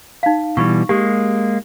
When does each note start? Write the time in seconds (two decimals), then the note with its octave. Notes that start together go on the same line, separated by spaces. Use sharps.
0.23 D#4 F5
0.57 B2 E3 G3 C#6
0.89 G#3 A#3 G4